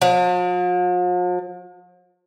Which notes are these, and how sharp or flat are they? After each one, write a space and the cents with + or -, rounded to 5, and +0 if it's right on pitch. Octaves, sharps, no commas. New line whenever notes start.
F3 +45